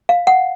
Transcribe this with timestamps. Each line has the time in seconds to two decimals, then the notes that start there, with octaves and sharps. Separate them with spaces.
0.09 F5
0.27 F#5